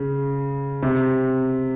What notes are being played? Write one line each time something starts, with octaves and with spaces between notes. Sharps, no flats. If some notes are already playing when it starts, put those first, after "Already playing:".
Already playing: C#3
C3